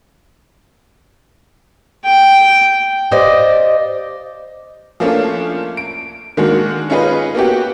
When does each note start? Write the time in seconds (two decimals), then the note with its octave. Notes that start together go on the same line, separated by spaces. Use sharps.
2.05 G5
3.11 G4 C5 D5 D#5 F5
5.00 F3 A3 A#3 C#4 D4 F4
5.77 D7
6.37 D#3 G#3 A#3 D4 F#4
6.90 C#4 D#4 F4 G#4 B4 D#5
7.35 A#3 B3 F#4 G4